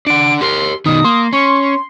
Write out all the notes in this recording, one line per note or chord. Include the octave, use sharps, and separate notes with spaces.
D4 F#5 D7
G4 A#4 C6
B2 D#3 D#4 D#6
A#3 C6
C#4 C#6